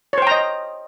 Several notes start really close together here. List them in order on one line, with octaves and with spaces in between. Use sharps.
C#5 C5 G5 A#5 D#5